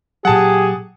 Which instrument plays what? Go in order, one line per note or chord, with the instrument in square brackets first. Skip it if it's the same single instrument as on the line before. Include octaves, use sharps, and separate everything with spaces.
[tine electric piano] A#2 F#3 [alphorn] G4 [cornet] G#4 [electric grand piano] F#5 A5